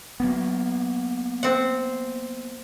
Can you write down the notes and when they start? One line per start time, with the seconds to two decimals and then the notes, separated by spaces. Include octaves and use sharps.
0.20 F#3 A#3 B3
1.43 C4 F#5